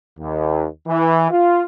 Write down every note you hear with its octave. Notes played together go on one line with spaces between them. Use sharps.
D#2
E3
F4